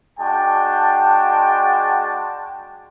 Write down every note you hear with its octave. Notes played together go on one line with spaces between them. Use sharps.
G#3 D4 F#4 G5 A5